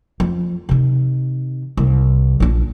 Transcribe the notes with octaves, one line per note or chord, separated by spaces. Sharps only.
F2
C3 D#3
C2
A#1 D4